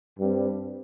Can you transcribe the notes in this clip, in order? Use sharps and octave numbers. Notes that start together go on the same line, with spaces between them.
G2 G3 C4